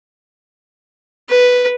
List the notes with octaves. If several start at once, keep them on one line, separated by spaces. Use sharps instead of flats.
B4